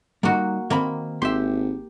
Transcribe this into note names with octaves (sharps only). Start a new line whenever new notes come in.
G3 A#3 D#4 F#4
D#3 A#3 C4 B5
G#1 G4 E5 C6